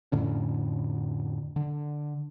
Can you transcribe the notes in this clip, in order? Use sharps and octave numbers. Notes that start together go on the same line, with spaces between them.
F2 A2 D3 C#4
D3